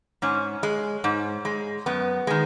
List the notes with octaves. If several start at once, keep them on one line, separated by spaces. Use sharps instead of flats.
G#2 C#4
G#3
G#2
G#3
F#2 B3
D#3 G#3